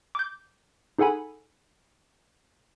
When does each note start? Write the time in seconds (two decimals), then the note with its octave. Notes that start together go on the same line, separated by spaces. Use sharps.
0.15 D6 G6
0.98 D#4 G#4 A4 F#5 G#5 B5